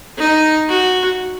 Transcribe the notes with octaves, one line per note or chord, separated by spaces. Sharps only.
D#4
F#4